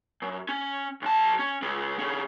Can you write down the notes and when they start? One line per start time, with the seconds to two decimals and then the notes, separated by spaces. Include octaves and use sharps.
0.22 F#2
0.49 C#4
1.02 B1 A5
1.39 C#4
1.62 C#3 G#3
1.99 D3 C#4